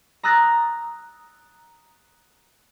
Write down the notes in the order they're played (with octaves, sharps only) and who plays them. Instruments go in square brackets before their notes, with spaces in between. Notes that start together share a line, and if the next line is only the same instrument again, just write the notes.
[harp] A#5 D#6 E6 F#6 A6 A#6